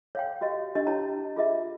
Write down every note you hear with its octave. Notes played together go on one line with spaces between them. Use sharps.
C#5 F5 G5
F#4 G4 D#5
D4 G4 D#5
E4 G4 C#5 G5 A5 A#5
F4 G#4 D#5 E5